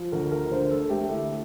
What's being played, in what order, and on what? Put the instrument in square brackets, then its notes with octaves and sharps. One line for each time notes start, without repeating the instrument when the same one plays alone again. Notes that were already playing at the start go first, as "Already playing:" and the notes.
Already playing: [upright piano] F3
D2 A#4
A#4
D3 C5
A4
A3 G4
E4